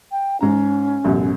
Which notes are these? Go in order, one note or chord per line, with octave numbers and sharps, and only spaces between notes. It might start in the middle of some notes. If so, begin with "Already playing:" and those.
G5
G#2 C#4 A#5
A1 F#2 B2